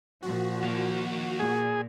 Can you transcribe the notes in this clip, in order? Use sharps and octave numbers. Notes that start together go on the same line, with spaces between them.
A#2 F3 F#4
D#2 A#3
A#2 G#4